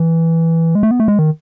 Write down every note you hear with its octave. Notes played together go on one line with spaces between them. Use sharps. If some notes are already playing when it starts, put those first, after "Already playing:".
Already playing: E3
G#3
A3
B3
A3
G#3
D#3